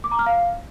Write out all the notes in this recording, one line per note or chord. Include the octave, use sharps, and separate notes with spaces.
D6
A#5
F6
F5